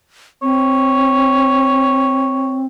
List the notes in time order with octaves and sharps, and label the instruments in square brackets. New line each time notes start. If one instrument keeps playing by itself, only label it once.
[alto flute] C4 [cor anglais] C#5